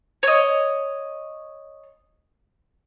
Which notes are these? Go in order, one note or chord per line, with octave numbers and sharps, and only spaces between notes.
C#5 D#5